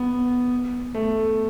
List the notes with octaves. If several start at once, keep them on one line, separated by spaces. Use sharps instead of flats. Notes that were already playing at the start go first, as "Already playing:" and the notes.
Already playing: B3
A3